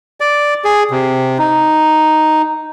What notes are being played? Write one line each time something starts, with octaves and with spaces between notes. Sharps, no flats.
D5
G#4
C3
D#4